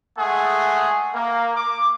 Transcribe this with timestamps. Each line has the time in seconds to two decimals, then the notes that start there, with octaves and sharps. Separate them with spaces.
0.17 G#3 A3 G#4 F#5
1.14 A#3
1.57 D6